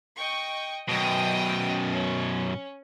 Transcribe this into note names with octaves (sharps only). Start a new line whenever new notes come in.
D#5 G5 C#6
F#2 B2 D#5 G5 D#6
C#4